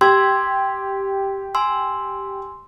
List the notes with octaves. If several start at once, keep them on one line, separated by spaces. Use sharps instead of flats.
G4 C6 E6 G#6
G#5 C6 E6